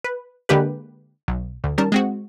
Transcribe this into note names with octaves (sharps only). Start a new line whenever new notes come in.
B4
D3 G#3 A#3 G4 B4
B1
D2
D#3 G3 C#4 A#4 A5
G#3 C4 F#4